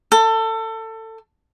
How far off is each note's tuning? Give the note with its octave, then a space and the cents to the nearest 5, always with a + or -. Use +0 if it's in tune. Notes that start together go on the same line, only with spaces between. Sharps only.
A4 +25